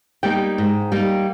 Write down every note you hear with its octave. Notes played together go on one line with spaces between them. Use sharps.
G3 A#3 D#4 G5
G#2
G3 A#3 D#4